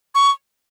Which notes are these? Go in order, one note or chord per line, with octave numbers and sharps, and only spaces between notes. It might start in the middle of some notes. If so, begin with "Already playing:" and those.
C#6